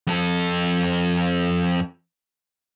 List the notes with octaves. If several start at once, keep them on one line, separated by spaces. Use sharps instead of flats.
F2 A4